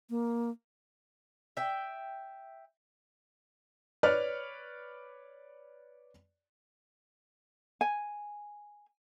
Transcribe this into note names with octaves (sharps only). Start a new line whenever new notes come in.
A#3
E5 G5
B4 C#5 D5 F6
G#5